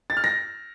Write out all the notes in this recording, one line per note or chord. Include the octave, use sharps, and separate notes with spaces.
A6
F6
A#6